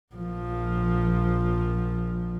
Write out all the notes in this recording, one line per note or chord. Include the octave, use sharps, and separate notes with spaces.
A#1 F3